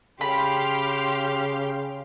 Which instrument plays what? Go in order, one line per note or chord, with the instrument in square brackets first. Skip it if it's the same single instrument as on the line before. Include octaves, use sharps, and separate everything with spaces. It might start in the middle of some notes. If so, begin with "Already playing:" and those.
[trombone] C#3 [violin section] G4 C6 F6 [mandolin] B5